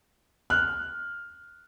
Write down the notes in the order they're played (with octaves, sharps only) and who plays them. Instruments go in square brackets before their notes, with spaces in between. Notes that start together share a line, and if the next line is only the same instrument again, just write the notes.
[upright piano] F6 [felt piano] F#6